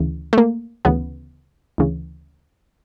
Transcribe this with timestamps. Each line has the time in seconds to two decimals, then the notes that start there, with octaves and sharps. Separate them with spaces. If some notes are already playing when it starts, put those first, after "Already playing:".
Already playing: D2 C#3 E3
0.33 A3
0.38 A#3
0.85 D2 C#3 E3 B3
1.78 D2 C#3 E3